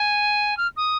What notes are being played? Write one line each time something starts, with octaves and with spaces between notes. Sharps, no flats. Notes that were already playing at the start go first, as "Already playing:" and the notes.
Already playing: G#5
F6
D#6